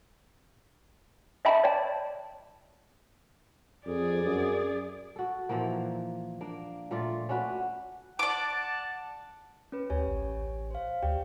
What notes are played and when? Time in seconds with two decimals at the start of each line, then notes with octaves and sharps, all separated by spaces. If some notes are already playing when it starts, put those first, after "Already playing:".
1.45 D#5 E5 G5 A5 B5
1.64 C#5 D5 G5 A5
3.86 F2 G#4 D5
4.25 F#2
5.16 F#4 A4
5.49 A#2 E3 F3 A#3
6.41 A#3 D4
6.91 A#2 A3 F4 D5
7.29 C#4 D4 F#4 B4
8.19 D5 F#5 A5 D6
9.72 C#4 B4
9.90 D2 G4 C#5 G#5
10.07 A1
10.71 C5 F5
11.03 D2 G4 D5 G5